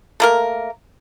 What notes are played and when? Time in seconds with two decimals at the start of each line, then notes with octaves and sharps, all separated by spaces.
0.20 A3 A#3 A#4